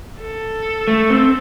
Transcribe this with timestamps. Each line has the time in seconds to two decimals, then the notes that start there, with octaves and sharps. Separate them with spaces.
0.21 A4
0.88 A3
1.10 C4